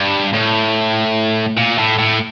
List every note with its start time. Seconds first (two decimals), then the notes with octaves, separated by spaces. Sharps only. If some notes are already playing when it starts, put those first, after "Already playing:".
Already playing: G2
0.34 A2
1.57 A#2
1.78 A2
1.99 A2